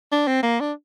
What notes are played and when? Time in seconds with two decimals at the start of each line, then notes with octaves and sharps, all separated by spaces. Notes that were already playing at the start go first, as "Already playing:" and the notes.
0.12 D4
0.27 C4
0.43 A#3
0.61 D4